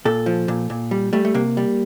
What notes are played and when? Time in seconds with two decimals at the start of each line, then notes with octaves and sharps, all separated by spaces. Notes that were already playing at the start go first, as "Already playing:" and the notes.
0.05 A#2 A4
0.26 F3
0.48 A#2
0.70 A#2
0.91 G3
1.13 G3 A3
1.25 A3
1.34 C3 A#3
1.57 G3